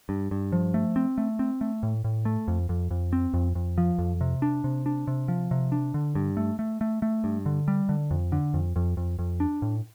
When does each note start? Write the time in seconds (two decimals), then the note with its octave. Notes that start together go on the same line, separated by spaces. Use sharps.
0.09 G2
0.31 G2
0.52 F3
0.74 A3
0.96 C4
1.18 A3
1.39 C4
1.61 A3
1.83 A2
2.04 A2
2.25 A3
2.48 F2
2.69 F2
2.91 F2
3.13 C4
3.34 F2
3.55 F2
3.78 F3
3.99 F2
4.21 C3
4.42 D4
4.64 C3
4.86 D4
5.07 C3
5.28 F3
5.51 C3
5.72 D4
5.94 D3
6.15 G2
6.37 A3
6.59 A3
6.81 A3
7.02 A3
7.24 G2
7.46 D3
7.68 G3
7.89 D3
8.11 F2
8.32 D3
8.54 F2
8.76 F2
8.97 F2
9.19 F2
9.40 D4
9.62 A2